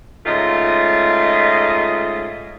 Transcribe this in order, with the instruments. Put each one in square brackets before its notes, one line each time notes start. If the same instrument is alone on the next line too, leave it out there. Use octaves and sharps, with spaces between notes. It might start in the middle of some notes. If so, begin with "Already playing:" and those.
[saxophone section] G#2 C#3 A3 F4 D#5